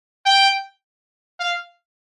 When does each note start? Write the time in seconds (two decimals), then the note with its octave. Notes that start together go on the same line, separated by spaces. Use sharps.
0.25 G5
1.40 F5